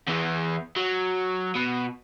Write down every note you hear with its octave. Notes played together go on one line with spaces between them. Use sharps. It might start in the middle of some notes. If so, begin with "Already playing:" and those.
E2 E3
F#3
B2